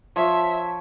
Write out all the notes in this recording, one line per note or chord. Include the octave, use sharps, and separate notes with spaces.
F3 C#5 E5